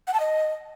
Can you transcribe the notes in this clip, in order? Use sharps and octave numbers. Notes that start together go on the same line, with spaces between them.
F#5
A5
D#5